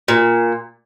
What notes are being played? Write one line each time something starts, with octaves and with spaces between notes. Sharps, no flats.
A#2